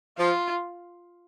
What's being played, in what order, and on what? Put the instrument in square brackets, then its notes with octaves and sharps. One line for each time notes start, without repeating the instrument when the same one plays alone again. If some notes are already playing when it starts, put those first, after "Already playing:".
[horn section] F3 [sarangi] F4